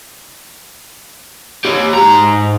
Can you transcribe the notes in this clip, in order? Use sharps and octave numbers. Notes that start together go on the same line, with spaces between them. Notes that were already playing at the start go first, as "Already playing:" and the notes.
G4 C#5
G#2 A#5